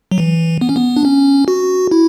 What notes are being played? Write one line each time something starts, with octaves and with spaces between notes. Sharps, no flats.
F#3
E3
B3
C#4
B3
D4
C#4
F#4
E4